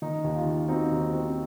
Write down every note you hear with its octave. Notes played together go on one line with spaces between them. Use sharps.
D#3 D#4
D#2
F4
D#3
C4 D#4 F#4
D#2
C4